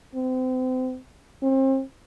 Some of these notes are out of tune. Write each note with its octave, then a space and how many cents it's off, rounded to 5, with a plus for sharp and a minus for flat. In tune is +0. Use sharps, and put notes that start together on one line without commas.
C4 -35
C4 +35